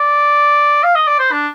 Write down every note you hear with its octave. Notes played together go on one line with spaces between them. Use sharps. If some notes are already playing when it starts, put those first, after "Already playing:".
Already playing: D5
F5
D#5
D5
C5
D4